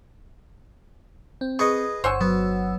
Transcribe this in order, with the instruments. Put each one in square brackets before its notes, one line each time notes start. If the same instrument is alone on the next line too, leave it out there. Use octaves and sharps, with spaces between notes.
[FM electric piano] C4
[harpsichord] G#4 B4 D#5 [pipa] C#6
[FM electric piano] G1 F#5 E6 [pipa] C5 C#5 G#5
[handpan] F#3 [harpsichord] B3